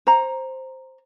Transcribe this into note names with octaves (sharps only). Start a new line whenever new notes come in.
C5 A#5